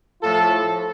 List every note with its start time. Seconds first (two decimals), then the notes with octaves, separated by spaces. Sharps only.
0.22 A2 F3 F4 A4